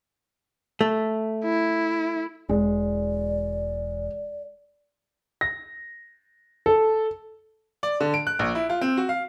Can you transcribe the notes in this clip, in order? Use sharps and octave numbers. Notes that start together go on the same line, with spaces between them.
A3
E4
E1 G#3 D5
A#6
A4
D5
D3
D7
F#6
A#1
E4
F4
C4
F#4
F5